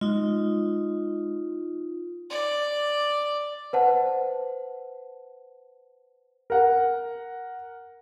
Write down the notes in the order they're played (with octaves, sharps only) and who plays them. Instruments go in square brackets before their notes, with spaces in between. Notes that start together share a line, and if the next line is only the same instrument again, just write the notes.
[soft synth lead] G#3 [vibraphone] D#4 F4
[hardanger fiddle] D5
[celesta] B4 C5 F#5 A5
[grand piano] A#4 F#5